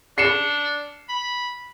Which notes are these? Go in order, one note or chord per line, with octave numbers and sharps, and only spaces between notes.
D4 C7 C#7 E7
B5